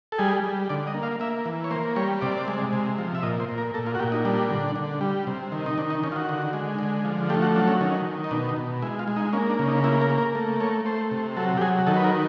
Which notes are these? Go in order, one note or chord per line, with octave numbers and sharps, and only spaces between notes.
A4
G3 G#4
G3
D3 D5
D#5
A#3
F5
A#3 E5
E3
C#5
A#3 C5
G3 C#5
C3 D5
G#3
C3
F3
E5
A#2 D#5
C5
A#2
A#4
A#2 A4
F4
F#4
A#2 G4
D#4
G3 D4
D3
D3
G3
C3
D#3
D#4
D#3 D4
D#4
D#3 C#4
F4
F#4
D3
G#3
D3
F3
A3 G4
F#4
F#3 D4
C#4
D#3 C#4
D#3
D#4
B2 D4
D#4
B2
G#3 E4
F4
G#3
D#4
A#3 C#4
D4
C#3
D#4
A#3 E4
A#4
A#3
A#4
A3
A3 C#5
A3 C5
C3
F#3 A4
G4
F#3 G#4
D#3 A4
B4
A#4